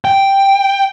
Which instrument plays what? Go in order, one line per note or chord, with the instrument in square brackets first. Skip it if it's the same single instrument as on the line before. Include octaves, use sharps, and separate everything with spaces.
[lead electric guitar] G5